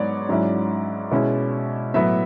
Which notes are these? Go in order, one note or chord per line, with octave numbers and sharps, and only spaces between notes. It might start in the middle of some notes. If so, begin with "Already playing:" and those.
Already playing: G#2 F#3 B3 C#5 D5
G#2 F#3 C#4 E4
B2 G#3 C#4 E4
A2 F#3 B3 E5